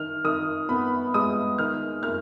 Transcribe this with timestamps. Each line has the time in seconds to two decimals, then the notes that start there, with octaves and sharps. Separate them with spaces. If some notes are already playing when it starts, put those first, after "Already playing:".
Already playing: D#3 F6
0.24 D#3 D#6
0.69 B3 B5
1.14 G#3 D#6
1.58 D#3 F6
2.03 A#3 F6